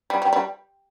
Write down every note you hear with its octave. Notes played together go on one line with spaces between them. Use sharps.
G3
G3
G3